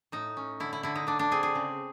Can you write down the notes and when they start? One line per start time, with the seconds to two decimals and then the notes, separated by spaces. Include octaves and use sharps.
0.12 A2 D#4
0.37 C#4
0.60 D3 E4
0.73 E4
0.83 D3 E4
0.95 D#4
1.07 D3 D4
1.19 D4
1.31 C4 G#4
1.43 G#4
1.55 C#3